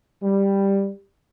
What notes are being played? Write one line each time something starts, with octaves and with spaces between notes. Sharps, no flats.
G3